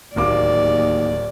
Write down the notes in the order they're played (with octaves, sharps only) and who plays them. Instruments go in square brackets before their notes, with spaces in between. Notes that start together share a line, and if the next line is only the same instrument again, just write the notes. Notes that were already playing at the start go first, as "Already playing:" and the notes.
[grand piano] D1 A#3 D6 [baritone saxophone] D#2 [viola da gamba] D5